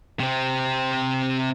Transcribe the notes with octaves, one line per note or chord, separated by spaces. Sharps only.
C3 C4